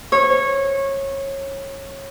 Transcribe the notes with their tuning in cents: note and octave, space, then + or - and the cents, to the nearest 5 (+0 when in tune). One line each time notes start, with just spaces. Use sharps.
C#5 -20